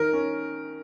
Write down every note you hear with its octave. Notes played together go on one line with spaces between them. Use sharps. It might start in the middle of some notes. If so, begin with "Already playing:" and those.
Already playing: D#3 A#4
C#4